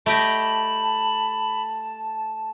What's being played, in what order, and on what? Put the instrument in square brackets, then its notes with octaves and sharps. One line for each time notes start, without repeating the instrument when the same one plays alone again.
[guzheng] A3 G4 D#5 [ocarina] A5 [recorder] B5